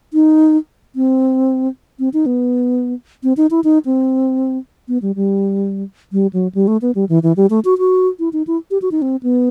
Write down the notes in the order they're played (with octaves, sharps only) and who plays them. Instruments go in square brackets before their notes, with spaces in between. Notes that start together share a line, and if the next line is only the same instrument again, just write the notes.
[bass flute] D#4
C4
C4
D#4
B3
C4
D#4
E4
D#4
C4
B3
G3
G3
G3
F#3
G3
A3
B3
G3
E3
E3
G3
A3
F#4
F#4
E4
D#4
E4
G4
F#4
D#4
C4
B3